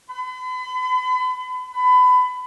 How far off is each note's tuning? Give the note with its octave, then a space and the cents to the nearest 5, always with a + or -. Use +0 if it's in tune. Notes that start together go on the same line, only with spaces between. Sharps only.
B5 +40
B5 +25